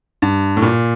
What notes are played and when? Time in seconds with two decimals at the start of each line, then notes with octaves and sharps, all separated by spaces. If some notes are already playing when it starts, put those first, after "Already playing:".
0.22 G2
0.57 A2
0.62 A#2